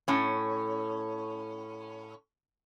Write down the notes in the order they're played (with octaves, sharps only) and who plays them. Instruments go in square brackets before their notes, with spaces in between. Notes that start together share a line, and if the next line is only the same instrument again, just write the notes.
[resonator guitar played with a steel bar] A2 C#4